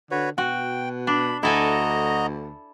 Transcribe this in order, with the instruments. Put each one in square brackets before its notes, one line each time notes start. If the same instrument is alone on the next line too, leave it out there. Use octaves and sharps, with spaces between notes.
[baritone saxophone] D3 [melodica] F#4 B4 C#5
[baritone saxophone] B2 [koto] F#4 [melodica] G5
[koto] D4 [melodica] B5
[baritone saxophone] D2 [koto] E4 A4 G#5 [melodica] F#4 D#5 A#5